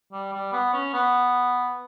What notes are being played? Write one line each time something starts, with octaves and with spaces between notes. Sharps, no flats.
G3
G3
B3
C#4
B3